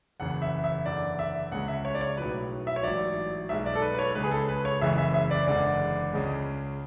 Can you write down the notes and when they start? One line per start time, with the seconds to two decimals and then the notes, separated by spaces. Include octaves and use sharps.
0.20 F#1 E2 C#3 F#5
0.42 E5
0.64 E5
0.86 F#1 E2 D3 D5
1.19 E5
1.52 C#2 C#3 G#3 F#5
1.68 E5
1.85 C#5
1.95 D5
2.01 C#5
2.17 B1 A2 F#3 B4
2.67 E5
2.76 C#5
2.83 A1 G#2 F#3 D5
3.49 B1 B2 G#3 E5
3.66 D5
3.75 A4
3.82 B4
3.95 B4
3.99 C#5
4.15 C#2 C#3 G#3 B4
4.24 G#4
4.31 A4
4.48 B4
4.65 C#5
4.81 F#1 E2 C#3 E3 G#3 E5
4.98 E5
5.14 E5
5.31 D5
5.47 F#1 E2 D3 G#3 D5
6.13 C#2 C#3 G#3